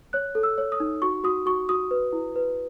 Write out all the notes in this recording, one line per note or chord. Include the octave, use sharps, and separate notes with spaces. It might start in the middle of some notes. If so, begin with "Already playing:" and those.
C#5 F#6
A4
E6
C#5
D#6
D#4
F#4 C#6
F#4 D#6
F#4 C#6
F#4 D#6
B4
E4
B4